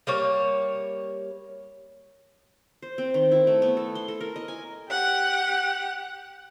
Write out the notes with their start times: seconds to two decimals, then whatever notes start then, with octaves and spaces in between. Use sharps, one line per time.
0.07 G3 A#3 C#5
2.82 C5
2.98 C4
3.14 D#3
3.31 E4
3.47 A3
3.62 B3
3.77 A4
3.95 C6
4.08 A4
4.21 A#4
4.36 D#5
4.48 G#5
4.88 G4 F#5